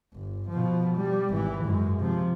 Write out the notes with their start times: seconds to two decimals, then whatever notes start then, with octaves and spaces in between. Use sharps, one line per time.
0.13 G1
0.49 B2 F3
0.97 G3
1.29 G#1 E3
1.64 F#2 G#3
2.00 C3 F3